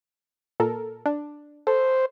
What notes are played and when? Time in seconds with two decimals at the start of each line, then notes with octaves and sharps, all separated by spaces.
0.60 A#2 A4 A#4
1.06 D4
1.67 A4 C5